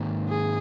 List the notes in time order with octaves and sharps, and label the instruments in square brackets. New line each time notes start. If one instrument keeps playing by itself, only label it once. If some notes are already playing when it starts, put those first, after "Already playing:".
Already playing: [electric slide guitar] G#2 D#3 A#3
[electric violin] G#4